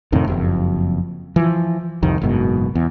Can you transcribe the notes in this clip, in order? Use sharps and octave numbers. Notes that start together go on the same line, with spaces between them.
F2 A2 C3 D#3
F#1 F2
E3 F3
C2 F2 D#3
F#1 G#2 B2
E2